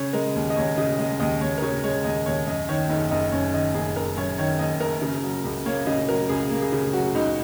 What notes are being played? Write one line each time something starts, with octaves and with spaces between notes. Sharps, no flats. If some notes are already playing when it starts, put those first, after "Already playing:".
Already playing: C#3 C#5
G#3 A#4
D#2
D#5
D#2 C#5
C#3 D#5
G#3 D#5
D#2 D#5
D#2 C#5
A#4
C#3 C#5
G#3 C#5
D#2 D#5
D#2 C#5
F#2 D#5
D#3 C#5
F#1 D#4
F#1 D#5
F#2 C#5
D#3 D#5
F#1 G#4
F#1 A#4
F#2 C#5
D#3 C#5
F#1 D#5
F#1 A#4
C#3
F#3
C#2
A#3 C#5
C#3 D#5
F#3 A#4
C#2 G#4
A#3
G#4
C#3
F#3 F#4
C#2 D#4